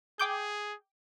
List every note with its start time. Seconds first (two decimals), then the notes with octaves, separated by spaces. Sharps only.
0.19 G#4 G5 D6 G6